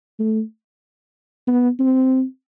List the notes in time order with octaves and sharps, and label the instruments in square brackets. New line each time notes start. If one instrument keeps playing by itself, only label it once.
[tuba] A3
B3
C4